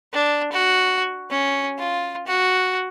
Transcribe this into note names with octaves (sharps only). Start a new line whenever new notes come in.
D4
F#4
C#4
F4
F#4